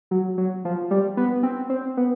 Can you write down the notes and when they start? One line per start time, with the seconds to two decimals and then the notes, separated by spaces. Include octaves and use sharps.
0.11 F#3
0.38 F#3
0.65 F3
0.91 G3
1.17 B3
1.43 C4
1.70 C4
1.97 B3